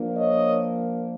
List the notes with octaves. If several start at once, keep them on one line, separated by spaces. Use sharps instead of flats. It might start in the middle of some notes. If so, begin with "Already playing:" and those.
Already playing: F3 A#3 D4
C#5 D#5